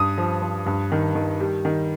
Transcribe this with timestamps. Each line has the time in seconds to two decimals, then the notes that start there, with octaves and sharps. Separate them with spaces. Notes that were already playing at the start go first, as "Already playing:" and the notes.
Already playing: G2 D#6
0.18 F3
0.42 F3
0.66 G2
0.92 D#3
1.15 D#3
1.40 G3
1.65 D#3